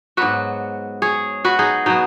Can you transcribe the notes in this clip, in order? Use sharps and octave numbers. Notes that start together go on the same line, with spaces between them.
G#2 F#3 B3 F#4 B4
G#4 C#5
F#4 B4
D#4 G#4
B2 F#3 B3 D#4